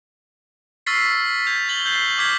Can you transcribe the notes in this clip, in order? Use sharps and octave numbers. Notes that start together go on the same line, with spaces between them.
C#6 E6 F6 A6 B6 C7
G6 G#6 F7
A6 F#7 G7
E6 G6 G#6 B6 C7 F#7
D6 F6 G6 G#6 B6 F#7